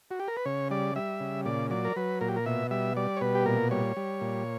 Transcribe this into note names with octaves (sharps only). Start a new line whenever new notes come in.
F#4
G4
A#4
B4
C#3 C#5
G3 D5
G3 E5
C#3
A#2 D5
F#3 D5
A#4
F#3 B4
A#2 A#4
G4
A#4
B2 E5
G3 E5
G3 D5
C#5
B2 B4
G4
A#2 A#4
G3 C#5
G3
A#2